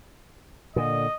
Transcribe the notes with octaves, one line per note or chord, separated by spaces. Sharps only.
A#2 D3 D#5